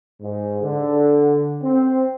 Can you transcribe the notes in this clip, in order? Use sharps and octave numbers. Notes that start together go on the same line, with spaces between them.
G#2
D3
C4